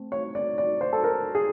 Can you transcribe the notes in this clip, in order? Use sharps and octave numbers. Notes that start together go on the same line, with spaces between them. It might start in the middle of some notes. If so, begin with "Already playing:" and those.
Already playing: A3 C4
C#5
D5
D5
C5
A4
A#4
G#4